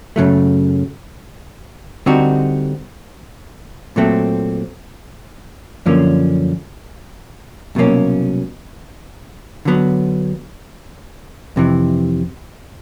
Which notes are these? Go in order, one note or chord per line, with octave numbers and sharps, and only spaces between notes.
F#2 C#3 F#3 A3
D3 G3 C4 D#4 F#4
A#2 F#3 A3 C4
F#2 D3 F3 A#3 C#4
C2 B2 F#3 A#3 C#4
D3 F#3 B3
F2 C3 E3